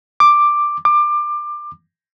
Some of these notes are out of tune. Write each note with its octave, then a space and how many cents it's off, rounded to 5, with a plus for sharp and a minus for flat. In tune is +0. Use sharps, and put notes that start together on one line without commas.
D6 +5
D6 +20